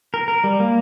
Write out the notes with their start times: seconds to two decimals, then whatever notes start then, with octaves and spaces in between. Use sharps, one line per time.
0.14 A#4
0.28 A#4
0.44 G3
0.60 A#3